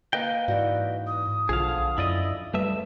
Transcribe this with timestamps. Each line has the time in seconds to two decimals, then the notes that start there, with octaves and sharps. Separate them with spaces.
0.13 A#3 B4 D#5 G5
0.48 G#2 E3 F#4 D5
1.07 D#6
1.49 B1 D3 F3 G#4 F5
1.98 F#2 E4 D5 D#5 B5
2.54 C#2 G3 A3 B4 E5